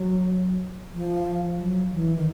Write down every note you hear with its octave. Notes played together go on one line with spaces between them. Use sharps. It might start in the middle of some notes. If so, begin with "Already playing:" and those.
Already playing: F#3
F3
F#3
E3
D#3